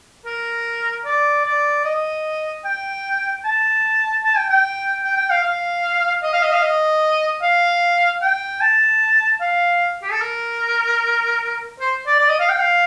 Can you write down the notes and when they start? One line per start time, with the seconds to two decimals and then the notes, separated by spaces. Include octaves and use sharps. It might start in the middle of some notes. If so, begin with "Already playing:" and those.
0.25 A#4
1.05 D5
1.45 D5
1.85 D#5
2.65 G5
3.44 A5
4.24 A5
4.37 G5
4.50 G5
5.03 G5
5.16 G5
5.30 F5
5.43 F5
6.22 D#5
6.33 F5
6.43 D#5
6.53 F5
6.62 D#5
7.42 F5
8.22 G5
8.61 A5
9.41 F5
10.02 G4
10.11 A4
10.21 A#4
11.80 C5
12.07 D5
12.20 D5
12.30 D#5
12.40 F5
12.49 G5
12.59 F5